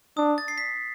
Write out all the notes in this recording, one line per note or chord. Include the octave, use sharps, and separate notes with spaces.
D4 D#6
A6
C7
B6